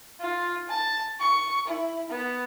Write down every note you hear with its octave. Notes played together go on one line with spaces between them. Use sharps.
F4
A5
C#6
E4
B3